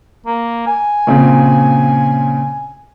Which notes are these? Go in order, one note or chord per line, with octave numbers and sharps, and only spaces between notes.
A#3
G#5
A#2 C#3 C4